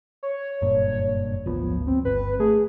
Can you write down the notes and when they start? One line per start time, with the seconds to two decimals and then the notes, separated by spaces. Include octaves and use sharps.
0.23 C#5
0.62 F#1 G2 A#2
1.46 D1 G#1 F3 B3
1.87 C4
2.05 G1 B4
2.40 A3 G#4